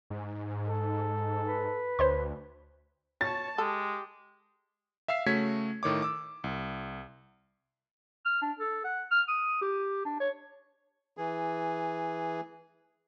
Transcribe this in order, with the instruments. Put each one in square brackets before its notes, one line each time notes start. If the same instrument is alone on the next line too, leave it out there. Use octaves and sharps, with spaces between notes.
[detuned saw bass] G#2
[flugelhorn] A4
[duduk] B4
[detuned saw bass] D2 [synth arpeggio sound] C5 C#5 C6
[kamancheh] C#5 A5 [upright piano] A6
[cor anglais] G#3 [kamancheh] G4 [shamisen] A4
[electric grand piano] E5 F5 E6 C7
C#3 A3 F#4 C#5 G#6 B6
A2 D#3 C#5 D6
D6 E6
C2
[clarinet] F6
D4
A4
F#5
F6
D#6
G4
D4
C#5
[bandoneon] E3 G#4